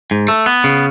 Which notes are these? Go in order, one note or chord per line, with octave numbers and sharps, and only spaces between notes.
G#2
A3
B3
C#3